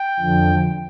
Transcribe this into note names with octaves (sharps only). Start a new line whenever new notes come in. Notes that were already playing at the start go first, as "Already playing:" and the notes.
Already playing: G5
F2 D3 F3